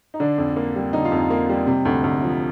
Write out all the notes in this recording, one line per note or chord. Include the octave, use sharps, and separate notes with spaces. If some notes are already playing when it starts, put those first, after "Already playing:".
D#4
D3 D4
F2
A#3
G3
D3 D#4
F4
F2
D#4
A#3
G3
C3
D2
D2
F3